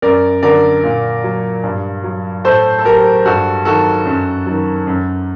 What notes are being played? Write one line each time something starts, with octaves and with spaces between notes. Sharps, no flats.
F#2 A#4 D5
D3 F#3 A#4 D5
A#2
F#3
G2
F#3
A2 A4 C5
A4
F#3 G4 A#4
G2 F#4 A4
D#3 F#3 F#4 A4
F#2
D#3 F#3
F#2